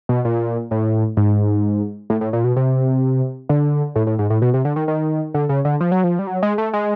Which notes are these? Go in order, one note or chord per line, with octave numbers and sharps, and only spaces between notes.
B2
A#2
A2
G#2
A2
A2
A#2
B2
C3
D3
A2
A2
G#2
A2
B2
C3
D3
D#3
D#3
D3
C#3
D3
F3
F#3
F3
G3
F#3
G#3
A3
G#3